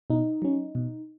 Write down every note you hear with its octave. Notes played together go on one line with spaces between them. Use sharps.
B2 D#4
F#3 C#4
B2